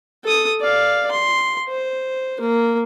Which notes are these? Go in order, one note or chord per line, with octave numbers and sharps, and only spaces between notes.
A4 D#6
D5 F5
C6
C5
A#3